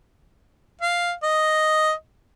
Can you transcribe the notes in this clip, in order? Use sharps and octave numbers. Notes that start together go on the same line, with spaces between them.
F5
D#5